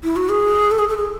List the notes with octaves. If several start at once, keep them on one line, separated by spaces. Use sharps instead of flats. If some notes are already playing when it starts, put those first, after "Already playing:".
E4
F#4
G#4
A4
G#4
A4
G#4